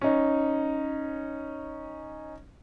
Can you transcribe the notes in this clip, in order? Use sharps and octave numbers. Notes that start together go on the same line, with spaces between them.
C#4 D#4